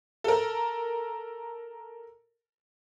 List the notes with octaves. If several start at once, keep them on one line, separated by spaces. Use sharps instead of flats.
A4 A#4